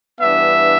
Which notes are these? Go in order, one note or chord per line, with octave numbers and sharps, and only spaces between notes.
G2 E3 B3 D4 E5